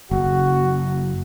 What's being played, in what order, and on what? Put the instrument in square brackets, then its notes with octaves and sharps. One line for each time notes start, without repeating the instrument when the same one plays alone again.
[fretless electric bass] F#1 [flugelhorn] F#4